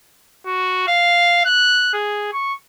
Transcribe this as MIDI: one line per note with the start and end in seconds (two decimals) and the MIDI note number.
0.46 0.85 66
0.87 1.42 77
1.45 1.93 90
1.93 2.32 68
2.33 2.53 85